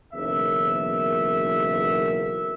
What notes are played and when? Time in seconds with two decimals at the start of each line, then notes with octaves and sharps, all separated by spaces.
0.13 F#1 B1 E2 A#4 E5